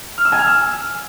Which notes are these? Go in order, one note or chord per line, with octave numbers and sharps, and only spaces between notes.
F6
E6
G#5
F6
E6